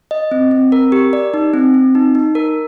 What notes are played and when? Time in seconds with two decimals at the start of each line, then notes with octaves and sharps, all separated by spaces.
0.11 D#5
0.31 C4
0.51 C4
0.72 A#4
0.92 G4
1.13 D5
1.34 D#4
1.54 C4
1.74 C4
1.95 D#4
2.15 D#4
2.35 A#4